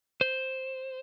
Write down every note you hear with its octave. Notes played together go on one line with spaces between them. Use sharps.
C5